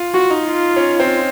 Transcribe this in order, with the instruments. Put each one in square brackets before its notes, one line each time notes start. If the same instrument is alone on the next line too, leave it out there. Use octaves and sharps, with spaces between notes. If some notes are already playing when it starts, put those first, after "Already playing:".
Already playing: [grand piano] F4
[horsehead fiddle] F#4
[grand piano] D#4
[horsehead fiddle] F4
[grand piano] C#4
C4